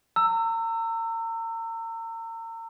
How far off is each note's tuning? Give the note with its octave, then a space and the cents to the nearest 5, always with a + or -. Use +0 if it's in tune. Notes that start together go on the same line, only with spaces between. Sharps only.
A#5 -35 E6 +10